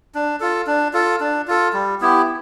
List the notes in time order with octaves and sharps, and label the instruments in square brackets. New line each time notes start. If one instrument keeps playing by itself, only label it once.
[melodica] D4
F4 A4
D4
F4 A4
D4
F4 A4
G3
B3 E4 G4